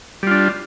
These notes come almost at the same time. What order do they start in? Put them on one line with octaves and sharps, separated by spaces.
G3 F4 D4